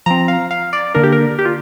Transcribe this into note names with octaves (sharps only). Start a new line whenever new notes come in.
F3 C4 A#5
F5
F5
D5
D3 A#3 D4 A#4
G4
A#4
G4
F4